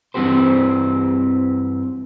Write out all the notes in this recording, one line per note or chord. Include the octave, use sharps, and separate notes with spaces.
G2 E3 C4 F#4 G4 C5